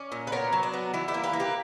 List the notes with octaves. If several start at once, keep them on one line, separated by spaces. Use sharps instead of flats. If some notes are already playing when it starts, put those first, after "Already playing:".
Already playing: C#4 D5
A#2
B4
B3 A#4 C#5
F#3
D4
B3
E3 E4
E4 G4
A#3
G4 B4
A#3
G4 B4